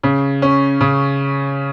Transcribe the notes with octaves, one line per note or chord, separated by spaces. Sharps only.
C#3
C#4
C#3